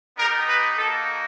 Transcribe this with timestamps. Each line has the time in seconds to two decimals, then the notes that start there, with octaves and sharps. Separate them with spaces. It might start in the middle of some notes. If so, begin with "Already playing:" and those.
0.17 B3 D#4 G4 A#4
0.47 B4
0.77 A#3 D#4 F#4 A4